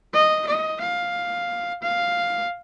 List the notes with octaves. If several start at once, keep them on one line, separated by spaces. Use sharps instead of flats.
D#5
D#5
F5
F5